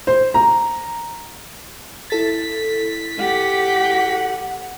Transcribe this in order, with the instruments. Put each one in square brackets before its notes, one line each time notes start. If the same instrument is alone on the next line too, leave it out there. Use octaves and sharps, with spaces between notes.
[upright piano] C5
A#5
[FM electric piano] E4 A4 A6 [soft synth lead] B6
[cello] G4 [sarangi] F#5